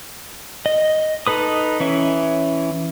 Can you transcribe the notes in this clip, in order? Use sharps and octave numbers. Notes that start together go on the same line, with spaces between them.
D#5
D#4 A4 B4 D#6
E3 C#4 E5